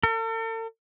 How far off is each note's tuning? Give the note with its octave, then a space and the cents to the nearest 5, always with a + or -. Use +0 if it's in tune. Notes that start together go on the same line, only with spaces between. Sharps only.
A4 +45